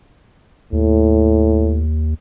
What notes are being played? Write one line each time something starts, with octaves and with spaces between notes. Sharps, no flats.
D#2 A2